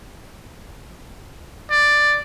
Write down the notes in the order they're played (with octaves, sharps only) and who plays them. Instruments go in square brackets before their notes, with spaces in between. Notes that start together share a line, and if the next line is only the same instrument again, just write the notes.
[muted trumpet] D5